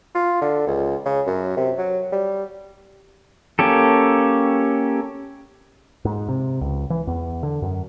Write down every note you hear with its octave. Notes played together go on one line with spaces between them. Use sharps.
F4
D3
C#2
C#3
F#2
C3
F#3
G3
A#3 C#4 G4 A4
G#2
C3
C#2
E3
E2
D3
F#2